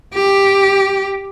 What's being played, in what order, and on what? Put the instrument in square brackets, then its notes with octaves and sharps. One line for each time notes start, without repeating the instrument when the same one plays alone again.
[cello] G4